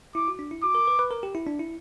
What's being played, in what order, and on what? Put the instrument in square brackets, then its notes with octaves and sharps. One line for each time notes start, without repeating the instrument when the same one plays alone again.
[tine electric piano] E4 [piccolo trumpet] D6
[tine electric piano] F#4
D4
E4
[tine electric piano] F#4 [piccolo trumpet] D6
[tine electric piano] A#4
B4
B4
A#4
G4
E4
D4
E4